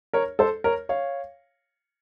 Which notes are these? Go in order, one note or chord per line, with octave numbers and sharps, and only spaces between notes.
A#4 C#5
A4 C5
A#4 C#5
C#5 F5